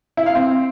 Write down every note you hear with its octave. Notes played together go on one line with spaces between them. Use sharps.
E4
F5
C4